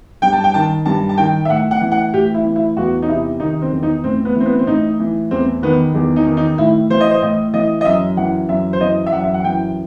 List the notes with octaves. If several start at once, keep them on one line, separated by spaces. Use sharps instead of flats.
G2 G5
A5
G5
D#3 A5
G2 A5
A5
D#3 G5
E5
A2 F#5
F#5
E3
F#5
A2 G4
E4
E3
E4
E2 F#4
D#4
C3 E4
D#3 D#4
C4
E2
D#4
A2 C4
B3
E3 C4
B3
C4
A2 D#4
E3
E2 C4
D#3 B3
E2
D#4
D#3
D#4
A2 E4
E3 C5
D#5
C5
A2 D#5
E3 D#5
D#5
F#2 E5
E3 F#5
F#2 E5
C5
E3 D#5
E5
F#2 F#5
E5
F#5
E3 G5